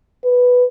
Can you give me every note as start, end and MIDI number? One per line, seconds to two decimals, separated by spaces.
0.24 0.65 71